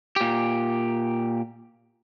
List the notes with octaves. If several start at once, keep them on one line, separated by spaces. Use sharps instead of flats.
A#2 G4